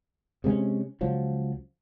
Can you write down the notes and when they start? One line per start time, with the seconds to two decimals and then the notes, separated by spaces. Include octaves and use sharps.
0.44 C3 G#3 A3 C#4
1.01 C#2 F3 F#3